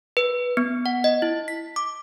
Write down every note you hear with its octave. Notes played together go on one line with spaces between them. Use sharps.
B4
B3
F#5
D#5
E4
B6
D6